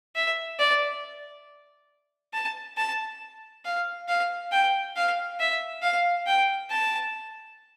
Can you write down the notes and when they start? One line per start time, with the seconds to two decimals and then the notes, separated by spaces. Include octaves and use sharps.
0.15 E5
0.59 D5
2.33 A5
2.77 A5
3.65 F5
4.08 F5
4.52 G5
4.96 F5
5.39 E5
5.82 F5
6.26 G5
6.70 A5